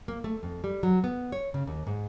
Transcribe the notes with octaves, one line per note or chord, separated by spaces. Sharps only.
A#3
A3
F2
G3
F#3
B3
C#5
C#3
D#2
G#2